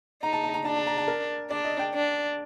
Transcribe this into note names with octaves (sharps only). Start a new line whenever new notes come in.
D#4 A#5
A5
A5
A#5
D4 A5
A5
A#5
A5
A#4
D4 D5
D#5
G5
D4